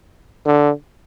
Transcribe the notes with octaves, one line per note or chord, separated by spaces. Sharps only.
D3